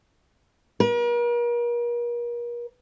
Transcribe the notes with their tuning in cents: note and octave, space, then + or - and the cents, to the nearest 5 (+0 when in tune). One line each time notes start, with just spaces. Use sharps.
A#4 +40